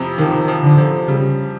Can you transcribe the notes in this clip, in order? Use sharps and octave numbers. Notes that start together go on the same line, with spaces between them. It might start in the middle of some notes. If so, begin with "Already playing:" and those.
Already playing: F2 C3 F3
D#3 F3
F3
D3
F3
C#3 G3